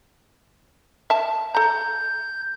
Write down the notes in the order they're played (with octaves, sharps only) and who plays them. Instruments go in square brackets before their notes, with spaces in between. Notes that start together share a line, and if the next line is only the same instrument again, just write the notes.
[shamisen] E5 A5
[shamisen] A4 A#5 [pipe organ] G6